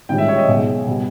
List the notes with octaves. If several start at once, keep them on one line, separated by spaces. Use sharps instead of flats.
A#1 G#2 D#3 G3 C#4 G5
E5
C#5
D#5
B1 B2 G#3
B2 G3